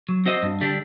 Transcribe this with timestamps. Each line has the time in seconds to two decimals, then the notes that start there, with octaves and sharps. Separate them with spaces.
0.09 F#3
0.26 C4 F#4 C5 D#5
0.43 G2
0.61 D3 G3 D4